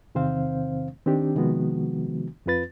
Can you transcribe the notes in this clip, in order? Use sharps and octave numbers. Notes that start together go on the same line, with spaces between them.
E2 C3 D#3 C4 C5 F5
D#3 C4 D4 G4
C3 D#3 F3 G#3 B3 F#4
F2 C4 F4 B4 A6